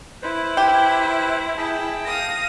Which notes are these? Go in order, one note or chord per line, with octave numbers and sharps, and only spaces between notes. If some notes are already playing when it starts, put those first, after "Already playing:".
E4 B4 C5
G4
E4 G#4 G5 A5
F5 D#6 A#6